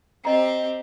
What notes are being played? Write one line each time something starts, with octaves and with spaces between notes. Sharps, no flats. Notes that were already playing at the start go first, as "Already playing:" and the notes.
C4 G4 D#5 A#5